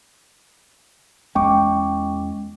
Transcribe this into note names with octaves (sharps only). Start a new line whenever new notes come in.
E2 G#3 C#4 G5 C#6 D6